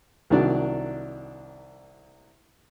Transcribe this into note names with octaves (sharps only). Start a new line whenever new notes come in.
C2 D#3 F#3 D4 D5